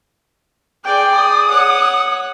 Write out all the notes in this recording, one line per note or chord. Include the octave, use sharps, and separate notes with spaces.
G#4 D5 G5
D#6
C#5 F#5